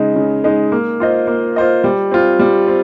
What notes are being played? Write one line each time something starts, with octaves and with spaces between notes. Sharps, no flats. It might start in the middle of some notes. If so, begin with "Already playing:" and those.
Already playing: C#3 G#3 D#4
C#3
G#3 D#4
A#3
F4 C5 D#5
A#3
F4 C5 D#5
G3
C4 F4
G3
C4